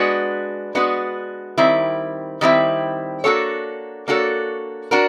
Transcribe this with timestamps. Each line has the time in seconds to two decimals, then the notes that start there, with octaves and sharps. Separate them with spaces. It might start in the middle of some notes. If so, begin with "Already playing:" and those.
Already playing: G#3 B3 D4 F#4 B4
0.75 G#3 B3 D4 F#4 B4
1.58 D#3 G3 C4 E4
2.41 D#3 G3 C4 E4
3.24 A#3 D4 F#4 A4 C#5
4.08 A#3 D4 F#4 A4 C#5
4.91 D4 F#4 A#4